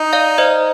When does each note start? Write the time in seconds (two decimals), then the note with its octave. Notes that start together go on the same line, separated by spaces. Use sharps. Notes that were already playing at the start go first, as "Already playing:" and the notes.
Already playing: D#4
0.13 D5 F5
0.38 C5 D#5